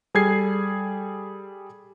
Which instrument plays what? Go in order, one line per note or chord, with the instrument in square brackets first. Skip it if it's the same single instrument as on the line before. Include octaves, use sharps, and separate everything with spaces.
[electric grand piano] G3 G#4 A4 G#6 C7